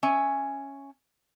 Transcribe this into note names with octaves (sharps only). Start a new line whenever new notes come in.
C#4 E5 G#5